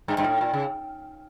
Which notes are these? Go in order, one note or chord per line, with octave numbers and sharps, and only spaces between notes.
G2
G2
A2
A#2
C#3